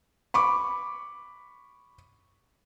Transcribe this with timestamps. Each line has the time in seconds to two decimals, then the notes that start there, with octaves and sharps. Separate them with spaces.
0.34 B5 C#6 D6